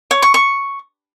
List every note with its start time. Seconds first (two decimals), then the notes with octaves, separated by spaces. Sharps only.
0.11 C#5
0.22 C#6
0.34 C#6